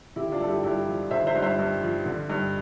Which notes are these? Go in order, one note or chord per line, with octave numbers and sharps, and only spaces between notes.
D3 E4 G4
D4 F4
G2 A4
E4 G4
G2 E4 G4
F3
D3 C5 E5
C5 E5
G2
C5 E5
G2
F3
D3
G2